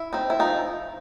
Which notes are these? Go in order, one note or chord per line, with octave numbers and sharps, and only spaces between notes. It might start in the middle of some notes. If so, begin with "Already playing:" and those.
Already playing: E4
C4 D#4
E4
F3 D#4